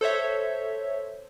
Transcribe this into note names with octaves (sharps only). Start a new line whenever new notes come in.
A4 C5 C#5 E5